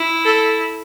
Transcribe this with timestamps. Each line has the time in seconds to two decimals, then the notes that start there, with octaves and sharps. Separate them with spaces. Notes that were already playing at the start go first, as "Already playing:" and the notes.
Already playing: E4
0.25 A4